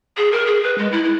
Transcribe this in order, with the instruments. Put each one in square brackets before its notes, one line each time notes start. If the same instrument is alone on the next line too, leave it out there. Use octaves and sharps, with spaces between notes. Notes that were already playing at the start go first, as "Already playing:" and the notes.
[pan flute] G#4
A#4
G#4
B4
G#3
E4
E4